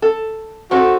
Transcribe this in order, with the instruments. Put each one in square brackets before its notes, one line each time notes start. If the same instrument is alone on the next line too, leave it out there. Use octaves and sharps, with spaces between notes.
[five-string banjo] A4
[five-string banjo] C4 D#4 A4 [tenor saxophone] F#4